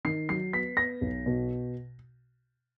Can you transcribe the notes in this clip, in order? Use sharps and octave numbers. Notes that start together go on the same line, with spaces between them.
D#3 C7
F#3 C7
B3 B6
B3 A#6
B1
B2